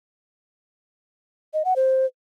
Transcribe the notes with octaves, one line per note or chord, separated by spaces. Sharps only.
D#5
F#5
C5